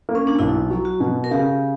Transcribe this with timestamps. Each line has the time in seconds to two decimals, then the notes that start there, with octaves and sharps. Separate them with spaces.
0.09 A#3
0.15 C#4
0.27 D4
0.39 B1 E4
0.70 F#3
0.85 F#4
1.00 B2
1.24 A#4
1.31 C#3 G4